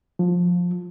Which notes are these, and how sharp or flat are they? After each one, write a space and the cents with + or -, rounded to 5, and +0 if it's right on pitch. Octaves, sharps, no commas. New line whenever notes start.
F3 +15